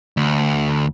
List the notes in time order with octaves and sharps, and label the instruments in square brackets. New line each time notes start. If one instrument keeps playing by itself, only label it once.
[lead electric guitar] D2